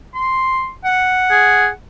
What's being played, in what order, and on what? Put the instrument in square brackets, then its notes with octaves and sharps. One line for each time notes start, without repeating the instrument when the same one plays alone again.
[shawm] C6
F#5
[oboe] G#4